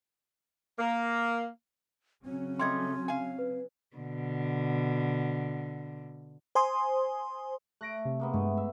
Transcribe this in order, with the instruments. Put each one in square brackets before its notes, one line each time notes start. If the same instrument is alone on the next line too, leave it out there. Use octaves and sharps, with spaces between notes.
[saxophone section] A#3
[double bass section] C#3 F#3 C#4 [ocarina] C4
[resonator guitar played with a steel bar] G3 A3 D#5 [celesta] C6 G#6
[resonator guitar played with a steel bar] F5 G#5
[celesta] B4
[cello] B2 D3
[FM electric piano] C5 G#5 C6 D#6
[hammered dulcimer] A3 [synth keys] F#6 A#6 D7
[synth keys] C3
[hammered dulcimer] G#3 A#3 B3
[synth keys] G2 G#3 [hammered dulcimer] A3
[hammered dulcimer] E5